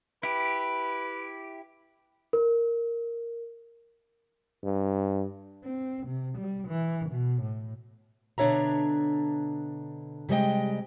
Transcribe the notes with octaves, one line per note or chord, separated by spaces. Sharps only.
E4 G4 B4
A#4
G2
C4
C3
G3
E3
B2
A2
B2 D3 D4 C#5 E5 A#5
C3 G3 G#3 D#5 G5